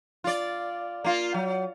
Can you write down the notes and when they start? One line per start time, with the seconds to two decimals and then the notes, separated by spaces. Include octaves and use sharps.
0.24 F4 D5
1.04 A#3 F4
1.34 F#3